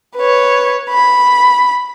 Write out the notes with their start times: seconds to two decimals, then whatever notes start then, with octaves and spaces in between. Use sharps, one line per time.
0.17 B4 C#5
0.90 B5